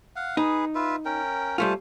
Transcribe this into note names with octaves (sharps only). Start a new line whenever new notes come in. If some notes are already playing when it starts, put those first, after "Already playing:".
F5 F#5
D#4 G#4 B4
F4 B4 E5
C#4 A#4 G5
G3 A3 F4 C5 G#5 A5